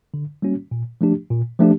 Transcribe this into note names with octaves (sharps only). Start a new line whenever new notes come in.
D3
G3 A#3 C#4 F#4
A#2
F3 A3 D4 G4
A#2
F3 A3 D4 G4